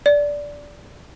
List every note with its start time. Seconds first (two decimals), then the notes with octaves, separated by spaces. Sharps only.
0.06 D5